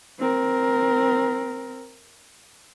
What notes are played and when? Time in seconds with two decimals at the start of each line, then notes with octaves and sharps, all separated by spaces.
0.19 C4 A#4